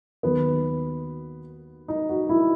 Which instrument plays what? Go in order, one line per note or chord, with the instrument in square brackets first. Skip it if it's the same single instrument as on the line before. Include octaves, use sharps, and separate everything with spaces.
[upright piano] D#2 D#3 F#3 B3
D#4
F#4
E4